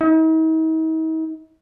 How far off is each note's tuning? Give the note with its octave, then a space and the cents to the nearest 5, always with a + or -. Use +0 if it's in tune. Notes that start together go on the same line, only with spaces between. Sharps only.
D#4 +45